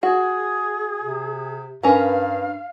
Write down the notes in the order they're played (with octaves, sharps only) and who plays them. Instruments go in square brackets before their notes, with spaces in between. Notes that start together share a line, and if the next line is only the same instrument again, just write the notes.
[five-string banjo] F#4 [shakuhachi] G#4
[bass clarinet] C3
[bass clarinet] G2 [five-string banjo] C#4 A#4 B4 [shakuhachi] F5